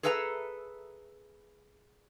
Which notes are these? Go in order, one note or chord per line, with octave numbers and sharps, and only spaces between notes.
G#4 A4 B4 E5 F#5 A#5